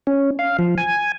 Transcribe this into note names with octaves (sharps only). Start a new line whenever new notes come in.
C#4
F5
F3
G#5